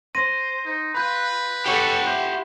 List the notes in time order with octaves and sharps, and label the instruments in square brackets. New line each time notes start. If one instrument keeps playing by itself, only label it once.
[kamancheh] C5 [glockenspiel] C6 A#6 D#7
[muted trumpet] D#4
[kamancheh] F4 [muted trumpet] B4 [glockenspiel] B5 G6
[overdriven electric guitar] G4 F#5 [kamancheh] A4 C#5 [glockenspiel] C#6 B6
[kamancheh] E4 [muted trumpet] C5